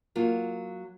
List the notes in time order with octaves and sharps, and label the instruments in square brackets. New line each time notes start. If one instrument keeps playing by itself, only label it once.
[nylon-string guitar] F#3 A#3 F4